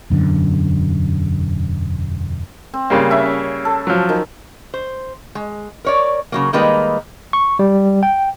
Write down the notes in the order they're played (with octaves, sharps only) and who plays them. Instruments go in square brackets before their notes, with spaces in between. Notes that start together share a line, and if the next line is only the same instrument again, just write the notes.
[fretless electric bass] E1 F#2 D3
[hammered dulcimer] C4
[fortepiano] C#3 G3 A#3
[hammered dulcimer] C#4 E5
A4
[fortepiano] F3 F#3
[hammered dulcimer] D#3
[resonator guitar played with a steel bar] C5
G#3
A#4 C#5 D5
C#3 F#3 A#3
D#3 G3 G#3 A#3 D#4 B4
[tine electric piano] C#6
G3
G5